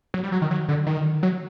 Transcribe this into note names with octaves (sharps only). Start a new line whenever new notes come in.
F#3
G3
F#3
D#3
F#3
D3
D#3
F#3